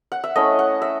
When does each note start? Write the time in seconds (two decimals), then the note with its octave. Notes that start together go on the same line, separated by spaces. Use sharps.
0.12 F#5
0.24 E5
0.36 A3 C#4 E4 D#5
0.59 F#5
0.82 E5